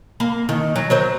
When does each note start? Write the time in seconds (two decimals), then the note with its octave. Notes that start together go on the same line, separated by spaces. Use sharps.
0.20 A#3
0.49 D#3
0.76 F#3
0.90 F#3 A#4 C5